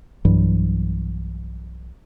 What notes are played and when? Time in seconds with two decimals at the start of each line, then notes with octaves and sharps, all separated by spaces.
0.25 B1 G2 E3 F#3